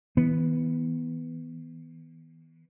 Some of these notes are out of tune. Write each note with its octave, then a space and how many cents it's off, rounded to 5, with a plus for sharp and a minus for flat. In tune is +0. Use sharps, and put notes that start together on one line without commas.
E3 -40 B3 +0